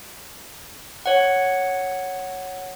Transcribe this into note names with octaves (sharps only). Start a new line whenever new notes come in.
C#5 F#5